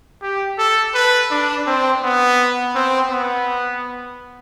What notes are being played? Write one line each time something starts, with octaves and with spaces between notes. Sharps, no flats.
G4
A4
B4
D4
C4
B3
C4
B3